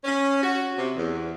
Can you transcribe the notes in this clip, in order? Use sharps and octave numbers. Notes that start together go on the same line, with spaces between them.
C#4
F#4
C3
E2